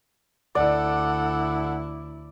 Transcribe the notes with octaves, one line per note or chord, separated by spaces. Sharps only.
D2 E4 A4 D5 F#5